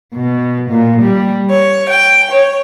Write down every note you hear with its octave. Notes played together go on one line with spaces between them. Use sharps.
B2
A#2
G3
C#5
G5
C#5